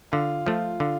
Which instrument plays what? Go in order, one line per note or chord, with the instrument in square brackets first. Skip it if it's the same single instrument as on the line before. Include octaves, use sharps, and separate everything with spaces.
[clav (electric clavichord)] D3 [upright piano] F4
[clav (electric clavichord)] F3 A3 [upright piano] F4
[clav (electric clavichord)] D3 [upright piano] F4